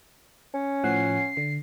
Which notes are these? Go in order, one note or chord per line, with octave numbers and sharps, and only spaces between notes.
C#4
A2 F3 F#5 C7
D3